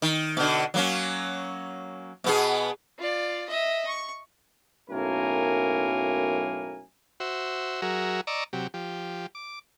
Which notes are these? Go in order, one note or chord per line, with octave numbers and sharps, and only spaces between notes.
D#3
B2 D3
F#3 A#3 C#4
B2 B3 G#4
F4 D5
D#5 E5
C#6
B1 F#2 A2 A#3 A#4 G#5
F#4 C5 E5
F#3 F#4 G#4 A#4 E5
D5 D#5 A#5 C#6 D6 E6
C3 F#3 G4
F3 G4
D6